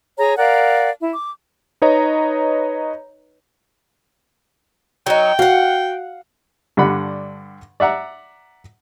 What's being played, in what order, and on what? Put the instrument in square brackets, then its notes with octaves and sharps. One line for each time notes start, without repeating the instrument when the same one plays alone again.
[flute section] G#4 C#5 A#5
A#4 D5 F5 F#5
E4
D6
[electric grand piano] D#4 B4 C#5 D#5 A#5
[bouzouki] F#3 D#4 [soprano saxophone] G5
[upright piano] F#4 [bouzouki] F5 F#5
[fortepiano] G2 D3 D4 F#5 B5
D5 E5 F#5 A#5